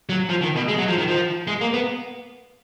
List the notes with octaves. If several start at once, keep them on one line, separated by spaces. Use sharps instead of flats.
F#3
F3
D#3
B2
G#3
F#3
F3
D#3
F3
G#3
A#3
B3